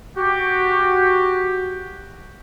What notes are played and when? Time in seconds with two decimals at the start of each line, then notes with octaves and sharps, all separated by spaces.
0.17 F#4 G4